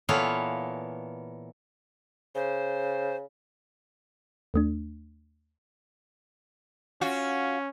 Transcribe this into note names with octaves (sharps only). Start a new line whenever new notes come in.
A#2 E3 B3 A4 C#5 F5
C#3 C5
D#2 A3 D4
C#4 F4 F#4